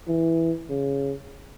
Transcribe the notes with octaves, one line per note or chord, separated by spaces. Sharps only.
E3
C#3